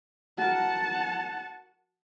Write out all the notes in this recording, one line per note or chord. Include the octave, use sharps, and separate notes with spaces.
F#4 A#4 F#5 A5